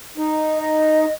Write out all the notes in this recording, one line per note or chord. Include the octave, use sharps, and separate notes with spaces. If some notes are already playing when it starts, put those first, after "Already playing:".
D#4
D#5